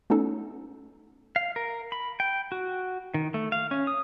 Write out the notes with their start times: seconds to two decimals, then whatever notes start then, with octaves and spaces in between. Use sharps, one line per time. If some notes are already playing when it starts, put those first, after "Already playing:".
0.10 A3 B3 C#4 D#4 A4
1.36 F5
1.56 A#4
1.92 B5
2.20 G5
2.52 F#4
3.14 D#3
3.34 A3
3.52 F5
3.71 C#4
3.87 D#6